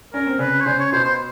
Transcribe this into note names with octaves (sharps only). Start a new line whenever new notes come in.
C#4 A#4
C4
C#3 C#4 B4
C#5
C#3 C#4 C5
C#5
B2 B3 C5
C5